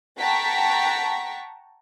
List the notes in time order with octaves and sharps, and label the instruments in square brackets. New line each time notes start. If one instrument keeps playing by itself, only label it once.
[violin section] F#5 G5 A5 A#5 C#6 B6